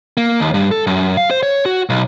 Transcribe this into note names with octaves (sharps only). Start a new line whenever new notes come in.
A#3
D#2
G2
A4
F#2
F5
C5
C#5
F#4
B1